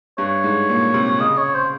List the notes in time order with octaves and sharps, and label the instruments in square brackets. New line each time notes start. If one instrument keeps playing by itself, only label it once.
[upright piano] G2 [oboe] C#5
[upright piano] G#2
A#2
C3
[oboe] C#5
[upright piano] C#3 [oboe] D#5
[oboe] C#5
C5